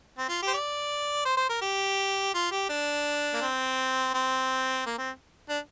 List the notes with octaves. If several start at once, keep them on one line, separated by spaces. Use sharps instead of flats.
C4
F4
G4
C5
D5
C5
C5
A#4
G4
F4
G4
D4
A#3
C4
C4
A#3
C4
D4